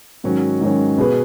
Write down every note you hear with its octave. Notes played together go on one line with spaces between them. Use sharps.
G#2 D#3 F#3 C#4
G#2 D#3 F#3 C#4
B2 B3 G#4 B4